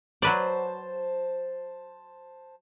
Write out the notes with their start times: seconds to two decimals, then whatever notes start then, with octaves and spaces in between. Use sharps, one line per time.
0.22 F#3 B4 C5 D5 A5